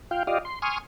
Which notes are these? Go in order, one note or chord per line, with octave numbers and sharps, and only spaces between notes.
F4 F5 G5
F4 G4 D5 D#5 F5
C6
G#5 C6 C#6 D#6 F6